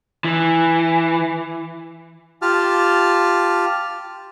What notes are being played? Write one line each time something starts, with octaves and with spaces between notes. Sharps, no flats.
E3
F4 G4 A5 F6